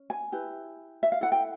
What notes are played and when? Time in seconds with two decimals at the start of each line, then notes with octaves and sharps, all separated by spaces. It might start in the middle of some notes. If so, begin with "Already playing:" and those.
Already playing: C#4
0.10 G#5
0.32 E4 G4 B4
1.03 E5
1.12 F5
1.21 E4 A4 F#5
1.32 G5